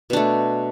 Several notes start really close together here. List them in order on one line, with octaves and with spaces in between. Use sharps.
B2 D4 A3